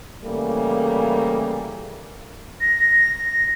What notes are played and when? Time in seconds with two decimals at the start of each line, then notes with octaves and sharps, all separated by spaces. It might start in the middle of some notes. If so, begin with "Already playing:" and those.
0.24 C#3 E3 G3 A3 A#3
2.61 A#6